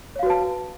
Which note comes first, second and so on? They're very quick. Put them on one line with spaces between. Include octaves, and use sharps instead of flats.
C#5 F5 F#4 B4 A5